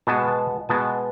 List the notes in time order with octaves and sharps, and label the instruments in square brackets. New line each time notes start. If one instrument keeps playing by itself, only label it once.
[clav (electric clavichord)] B2 G#3 B3 A5
A5
B2 G#3 B3 A5